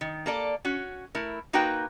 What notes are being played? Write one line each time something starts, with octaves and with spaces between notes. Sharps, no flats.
D#3
A#3 A4 D5
C#4 F#4
A3 E4 A#4
A#3 D#4 F#4 A#4 B4 G5